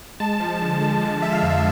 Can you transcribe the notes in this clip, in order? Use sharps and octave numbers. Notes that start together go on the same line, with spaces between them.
G#3 A5
F3
D3
G#3
D3 A5
G#3 E5
F5
F2 E5